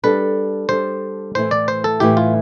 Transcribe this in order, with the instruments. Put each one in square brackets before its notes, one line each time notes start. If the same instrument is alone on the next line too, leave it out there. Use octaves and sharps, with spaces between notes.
[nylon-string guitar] G3 D4 A4 [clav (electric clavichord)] B4
[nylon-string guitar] G3 D4 A4 [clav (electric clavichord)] C5
[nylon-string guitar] A2 E3 A3 E4 [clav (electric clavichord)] C5
[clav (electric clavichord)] D5
C5
A4
[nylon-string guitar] A2 E3 A3 E4 [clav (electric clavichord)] G4
[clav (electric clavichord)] F4